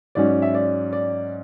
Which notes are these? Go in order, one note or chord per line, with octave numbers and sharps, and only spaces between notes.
G#2 F#3 C#4 D5
E5
D5
D5